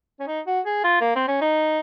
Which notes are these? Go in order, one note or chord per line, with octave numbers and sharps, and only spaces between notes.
C#4
D#4
F#4
G#4
F4
A#3
C4
C#4
D#4